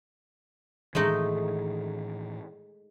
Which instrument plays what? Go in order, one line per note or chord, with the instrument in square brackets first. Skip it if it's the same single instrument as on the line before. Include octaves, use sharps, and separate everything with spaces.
[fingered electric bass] A2 D#3 E3 [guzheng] G#3 A3 D#4